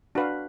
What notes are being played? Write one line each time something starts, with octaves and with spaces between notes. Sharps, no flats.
D4 F#4 B4 F5